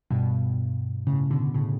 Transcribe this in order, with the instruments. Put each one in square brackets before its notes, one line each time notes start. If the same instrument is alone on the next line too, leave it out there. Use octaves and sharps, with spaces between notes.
[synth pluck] G2 B2
A2 C#3
B2 D3
A2 C#3